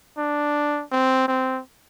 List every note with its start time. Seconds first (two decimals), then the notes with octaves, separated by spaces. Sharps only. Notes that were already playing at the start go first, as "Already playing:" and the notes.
0.18 D4
0.92 C4
1.28 C4